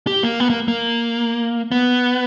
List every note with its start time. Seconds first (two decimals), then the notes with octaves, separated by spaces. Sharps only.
0.07 G4
0.23 A#3
0.40 B3
0.50 A#3
0.68 A#3
1.71 B3